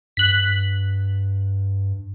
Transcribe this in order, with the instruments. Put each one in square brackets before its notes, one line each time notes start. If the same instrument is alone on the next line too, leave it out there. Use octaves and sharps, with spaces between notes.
[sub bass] G2 [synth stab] F#6 B6